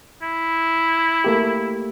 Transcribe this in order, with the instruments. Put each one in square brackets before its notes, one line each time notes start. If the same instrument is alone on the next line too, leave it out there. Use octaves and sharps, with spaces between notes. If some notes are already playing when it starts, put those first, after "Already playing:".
[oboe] E4
[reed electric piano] A3 A#3 G4